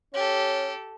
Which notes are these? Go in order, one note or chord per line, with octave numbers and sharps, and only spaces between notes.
C#4 G4 A4